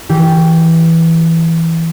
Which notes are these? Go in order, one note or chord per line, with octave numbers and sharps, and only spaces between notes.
E3 G4